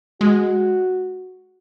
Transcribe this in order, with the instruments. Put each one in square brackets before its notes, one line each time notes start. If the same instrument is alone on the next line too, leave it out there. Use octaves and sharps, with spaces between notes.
[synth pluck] G#3 [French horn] F#4